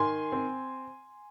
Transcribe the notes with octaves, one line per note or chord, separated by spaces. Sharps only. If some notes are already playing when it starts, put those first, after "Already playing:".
Already playing: D#3 G#5 C6
C4